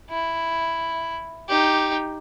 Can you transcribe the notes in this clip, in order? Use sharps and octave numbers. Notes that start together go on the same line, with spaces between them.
E4
D#4 G4